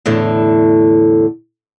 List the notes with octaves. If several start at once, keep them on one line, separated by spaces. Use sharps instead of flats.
E2 A2 D3